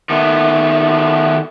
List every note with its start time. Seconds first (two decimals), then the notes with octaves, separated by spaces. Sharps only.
0.10 D#3 A3 B3